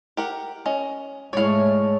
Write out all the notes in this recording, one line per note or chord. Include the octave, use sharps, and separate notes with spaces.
G4 A#4 F#5
C#4 D#5
G#2 G#3 A3 E4 C#5 D5 F5